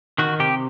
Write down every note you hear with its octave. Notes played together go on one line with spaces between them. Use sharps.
D#3 F#4
C3 G4